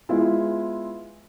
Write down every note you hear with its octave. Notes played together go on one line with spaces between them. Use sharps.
G#3 B3 E4 F4